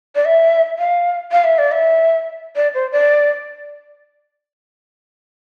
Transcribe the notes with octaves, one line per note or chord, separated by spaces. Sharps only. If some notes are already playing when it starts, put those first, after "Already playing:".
D5
E5
F5
F5
E5
D5
E5
D5
C5
D5